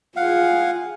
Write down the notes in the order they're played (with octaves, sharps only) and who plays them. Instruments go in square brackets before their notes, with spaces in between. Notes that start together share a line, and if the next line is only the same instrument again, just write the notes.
[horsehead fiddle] F4 G#4 [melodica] F5 F#5